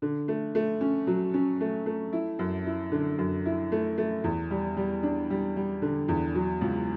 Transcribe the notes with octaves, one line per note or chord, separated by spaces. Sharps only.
D3
A3
A3
C#4
F#3
C#4
A3
A3
E4
F#2
E4
D3
F#2
E4
A3
A3
E2
G3
G3
D4
G3
G3
D3
E2
F#3
C#2